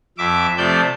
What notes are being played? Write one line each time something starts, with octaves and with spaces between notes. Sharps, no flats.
F2 E5 D6
C3 F3 A3 D5 G6